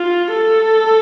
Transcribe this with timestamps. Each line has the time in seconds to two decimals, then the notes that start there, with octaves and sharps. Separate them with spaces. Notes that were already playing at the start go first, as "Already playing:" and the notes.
Already playing: F4
0.34 A4